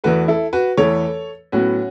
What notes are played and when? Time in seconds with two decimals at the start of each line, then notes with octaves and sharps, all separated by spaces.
0.04 E2 E3 A3 F#4 B4
0.28 E4 A4
0.53 F#4 B4
0.77 E2 E3 A3 A4 C#5
1.52 A2 F#3 B3 C#4 F#4